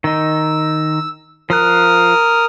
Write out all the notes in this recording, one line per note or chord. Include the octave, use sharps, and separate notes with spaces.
D#3 D#4 E6
F3 A#4 D#6 F6 F#6